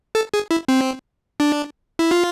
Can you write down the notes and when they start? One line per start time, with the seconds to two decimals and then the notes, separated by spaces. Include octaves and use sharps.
0.15 A4
0.34 G#4
0.51 E4
0.68 C4
1.40 D4
1.99 E4
2.11 F4